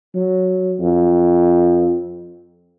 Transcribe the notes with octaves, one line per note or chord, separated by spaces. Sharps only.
F#3
F2